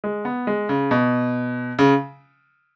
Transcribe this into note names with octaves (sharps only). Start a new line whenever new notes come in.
G#3
B3
G#3
C#3
B2
C#3